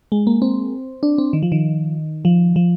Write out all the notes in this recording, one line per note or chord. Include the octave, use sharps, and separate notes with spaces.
G#3
A#3
C4
D4
C4
D#3
F3
D#3
F3
F3